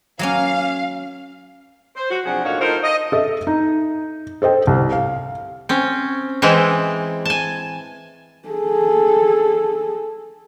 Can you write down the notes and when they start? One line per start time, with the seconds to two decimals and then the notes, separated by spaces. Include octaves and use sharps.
0.19 F#3 A#3 C#4 F5
1.96 C5
2.10 F#4
2.25 C3 F3 F#3 D4 G#4 F#5
2.44 D2 A#2 D#4 F#4 C#5 F5
2.60 A3 D#4 F4 A#4 C5
2.83 D#5
3.12 A4 D#5 E5
3.47 D#4
4.42 A4 C5 D#5 G5
4.67 C2
4.93 F5
5.69 C4 C#4
6.42 E3 G#3 C4 E4
7.25 G#5 A5
8.49 G#4 A4